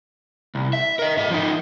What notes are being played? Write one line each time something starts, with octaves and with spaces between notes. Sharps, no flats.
C2
E5
A#4 D#5
G#2 E5
F3 D#4